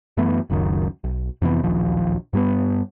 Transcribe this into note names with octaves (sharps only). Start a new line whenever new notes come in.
F#2 E3 A3 B3
F#1 C#2 F#2 D#3
B1
F2 C3 E3 B3
D1 A#1 D#2 F3
G2 G3 A#3 B3